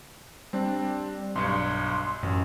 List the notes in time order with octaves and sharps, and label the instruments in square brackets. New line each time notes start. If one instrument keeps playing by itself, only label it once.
[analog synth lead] G3 [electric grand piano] C4 D4
[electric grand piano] B1 G2 C#7 [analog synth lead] C6
[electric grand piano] A1 [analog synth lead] F#2